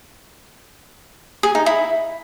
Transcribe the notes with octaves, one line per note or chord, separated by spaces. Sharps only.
G#4
D#4
E4